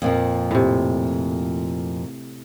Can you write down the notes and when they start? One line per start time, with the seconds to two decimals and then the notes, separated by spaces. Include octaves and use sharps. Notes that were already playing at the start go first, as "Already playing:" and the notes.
0.02 F2 A#2 F3
0.51 A2 C3